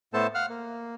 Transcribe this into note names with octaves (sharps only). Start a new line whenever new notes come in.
A2 A3 B3 A4 C5 A5
F5 F#5 F6
A#3